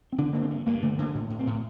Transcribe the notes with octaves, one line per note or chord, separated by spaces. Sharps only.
C4
D3 D4
D3 A#3
C4
G2
G2 A#3
D3 A3
D3 A#3
A2
A2
C4
A2